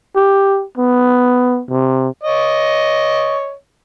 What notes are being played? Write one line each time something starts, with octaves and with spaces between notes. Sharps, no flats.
G4
B3
C3
C#5 D#5